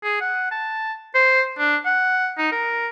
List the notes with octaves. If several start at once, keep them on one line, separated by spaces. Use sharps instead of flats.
G#4
F#5
A5
C5
D4
F#5
D#4
A#4